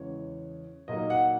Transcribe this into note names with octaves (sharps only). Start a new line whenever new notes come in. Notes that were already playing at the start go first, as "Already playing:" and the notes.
Already playing: E2 C#3 E3 G#3 C#5
A#2 F#3 A#3 D#4 D#5
F#5